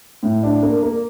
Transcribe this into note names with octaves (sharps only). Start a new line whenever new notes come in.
A2
D4
A#3
A#3